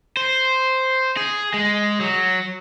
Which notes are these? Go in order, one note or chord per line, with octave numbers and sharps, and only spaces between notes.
C5
G#4
G#3
F#3